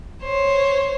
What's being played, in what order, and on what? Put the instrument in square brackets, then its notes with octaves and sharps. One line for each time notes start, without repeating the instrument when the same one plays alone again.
[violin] C5 C#5